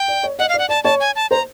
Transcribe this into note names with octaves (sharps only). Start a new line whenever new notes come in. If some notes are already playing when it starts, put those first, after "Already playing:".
Already playing: G5
D5
C#5
D#5 F#5
F5
D5
F#5
D5 A5
C#5 A5
G#5
A5
C5 A#5